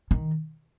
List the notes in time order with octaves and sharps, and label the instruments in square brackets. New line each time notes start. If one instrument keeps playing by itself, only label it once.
[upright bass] D#3